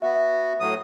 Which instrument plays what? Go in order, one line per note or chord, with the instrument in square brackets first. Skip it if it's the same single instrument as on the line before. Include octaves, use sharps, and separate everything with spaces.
[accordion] B3 F#4 [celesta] E5
[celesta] E5
[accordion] A2 F#3 D#6